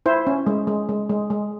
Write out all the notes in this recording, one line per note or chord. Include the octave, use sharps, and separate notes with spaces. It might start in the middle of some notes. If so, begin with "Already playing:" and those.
E4 C5
C#4
G#3
G#3
G#3
G#3
G#3